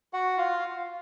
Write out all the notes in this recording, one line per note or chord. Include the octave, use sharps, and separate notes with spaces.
F#4 F#5
F4 F5